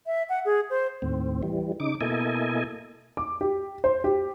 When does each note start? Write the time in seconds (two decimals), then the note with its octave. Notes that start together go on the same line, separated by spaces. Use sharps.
0.06 E5
0.29 F#5
0.45 G#4
0.70 C5
1.02 D#2 A2 C4
1.43 E3 G3
1.80 C#3 D#4 D6
2.01 B2 A#3 E4 A4 D#5 G#5
3.17 D6
3.41 G4
3.84 C5
4.04 G4